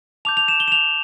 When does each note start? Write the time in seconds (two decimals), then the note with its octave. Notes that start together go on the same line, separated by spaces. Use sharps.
0.25 A5 D6 G6 F7
0.37 F7
0.48 E7
0.60 G7
0.68 E7
0.72 F7